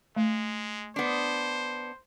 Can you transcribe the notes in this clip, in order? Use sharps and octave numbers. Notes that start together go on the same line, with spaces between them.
G#3 A3
B3 D4 C5